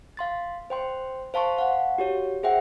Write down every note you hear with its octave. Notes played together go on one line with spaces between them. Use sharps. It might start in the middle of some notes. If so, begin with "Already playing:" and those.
F5 C6 A6
C5 G5 C6
C5 F5 A5 C6 C#6
F5 F#5
F#4 G4 C#5
G#4 C5 E5 F#5 G5